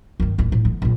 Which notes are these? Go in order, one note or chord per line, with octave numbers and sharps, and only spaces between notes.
G2 D#3
A1 D#2
A2
D3 E3
A#1 D3